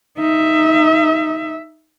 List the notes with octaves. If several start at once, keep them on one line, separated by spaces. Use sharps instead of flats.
D#4 E5